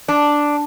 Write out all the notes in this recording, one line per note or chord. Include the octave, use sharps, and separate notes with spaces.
D4